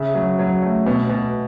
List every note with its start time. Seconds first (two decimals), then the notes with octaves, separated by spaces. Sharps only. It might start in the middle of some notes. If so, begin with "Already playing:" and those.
Already playing: C#3 E5
0.15 F#3
0.39 F#3
0.62 A3
0.86 B2
1.10 B2